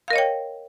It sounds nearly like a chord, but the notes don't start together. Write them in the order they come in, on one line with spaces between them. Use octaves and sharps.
F5 A#4 D#5 C#5 G5